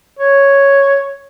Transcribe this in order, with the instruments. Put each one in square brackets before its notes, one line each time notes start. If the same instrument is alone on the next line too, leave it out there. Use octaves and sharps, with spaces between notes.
[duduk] C#5